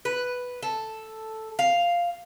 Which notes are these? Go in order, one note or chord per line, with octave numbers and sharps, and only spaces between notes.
B4
A4
F5